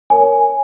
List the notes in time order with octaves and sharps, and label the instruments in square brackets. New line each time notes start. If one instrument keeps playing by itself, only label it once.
[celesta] A#4 C#5 G#5